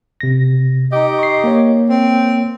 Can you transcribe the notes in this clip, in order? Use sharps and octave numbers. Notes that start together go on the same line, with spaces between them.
C3 A#6
D#4 G4 D#5
C#6 C7
A#3 C#5
C4